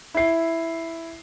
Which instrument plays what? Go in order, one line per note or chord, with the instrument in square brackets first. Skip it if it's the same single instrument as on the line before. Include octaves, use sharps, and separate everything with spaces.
[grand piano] E4 C7